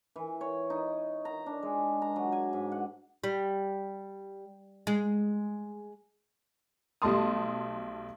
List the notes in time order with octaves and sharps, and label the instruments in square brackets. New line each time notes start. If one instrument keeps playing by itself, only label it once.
[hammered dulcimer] E3
C#5
D#4
A#5
D4
G#3
A#5
F#3
G#5
G#2
F#5
[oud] G3
G#3
[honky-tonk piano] B1 G3 A3 A5 C6 D#6